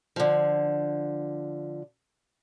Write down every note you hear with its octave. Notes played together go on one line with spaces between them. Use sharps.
D3 F3